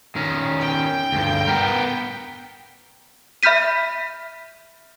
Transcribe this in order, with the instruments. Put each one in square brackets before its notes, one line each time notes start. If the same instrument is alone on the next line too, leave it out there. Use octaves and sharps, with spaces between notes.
[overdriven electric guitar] D#3 C#4
[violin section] G5
[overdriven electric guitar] D2 G2
B3 A#4
[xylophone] E5 B5 F6 G6 B6 D#7